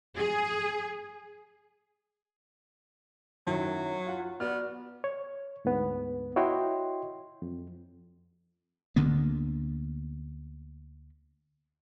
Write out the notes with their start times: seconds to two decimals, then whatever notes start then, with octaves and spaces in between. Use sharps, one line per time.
0.17 G#4
3.47 F#2 D#3 F#3 E4
4.07 F4 F#5
4.40 B3 F#4 D5 F6
5.04 C#5
5.65 D2 G#2 B3
6.36 E4 F#4 C#5 D#5 G5 C6
7.42 F2
8.96 D2 D3 A#3 B3